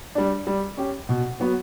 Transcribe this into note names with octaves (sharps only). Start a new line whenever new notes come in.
G3 D4
G3
C#4 G4
B2
F#3 B3 F#4